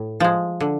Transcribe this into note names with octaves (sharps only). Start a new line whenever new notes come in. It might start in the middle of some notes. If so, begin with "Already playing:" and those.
Already playing: A2
F3 G#3
D3